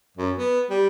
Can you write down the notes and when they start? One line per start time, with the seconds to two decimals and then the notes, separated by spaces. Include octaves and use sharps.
0.17 F#2
0.37 B3
0.70 G3